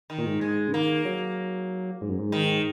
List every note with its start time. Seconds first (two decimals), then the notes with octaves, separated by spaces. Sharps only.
0.10 D#3
0.18 A#2
0.26 G#2
0.41 G#2 G#3
0.68 C#3
0.73 D#3 A#3
1.05 F#3
2.01 G#2
2.09 F#2
2.19 G#2
2.32 D#3